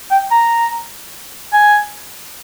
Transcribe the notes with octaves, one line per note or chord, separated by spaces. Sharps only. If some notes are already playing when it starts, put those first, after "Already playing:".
G5
A#5
G#5